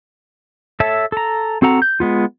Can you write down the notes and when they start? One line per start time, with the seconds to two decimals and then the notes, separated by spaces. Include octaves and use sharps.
0.80 A4 C#5 E5 A5
1.12 A4 A#5
1.62 C4 F#4 A4 F#5 A#5
1.82 G6
2.00 G#3 B3 F4